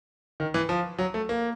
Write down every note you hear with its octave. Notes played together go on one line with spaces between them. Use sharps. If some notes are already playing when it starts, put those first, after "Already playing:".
D#3
E3
F3
F#3
A3
A#3